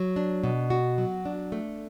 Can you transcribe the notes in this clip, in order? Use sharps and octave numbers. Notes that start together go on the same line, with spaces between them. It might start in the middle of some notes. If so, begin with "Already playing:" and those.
Already playing: F#3
D4
B2
F#4
F#3
D4
A3